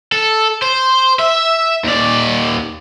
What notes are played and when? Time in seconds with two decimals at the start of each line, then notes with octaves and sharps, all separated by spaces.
0.12 A4
0.62 C5
1.19 E5
1.84 D#2 D5